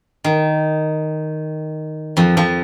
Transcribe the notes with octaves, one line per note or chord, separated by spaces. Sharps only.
D#3
F2 F3
F2 F3